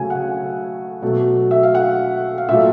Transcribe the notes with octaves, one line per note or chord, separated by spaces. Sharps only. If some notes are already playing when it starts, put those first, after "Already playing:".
Already playing: C#3 F#3 A3 G#5
F#5
B2 F#3 A3
E5
F5
F#5
F5
A#2 F#3 A3 E5